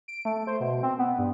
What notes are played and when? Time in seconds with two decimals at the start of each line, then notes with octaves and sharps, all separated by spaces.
0.08 D7
0.25 A3
0.47 C5
0.60 B2
0.83 C4
0.99 B3
1.18 G2